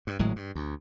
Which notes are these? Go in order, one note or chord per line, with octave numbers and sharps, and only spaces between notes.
G2
G#1 A2 F#3 G#3
G2
D2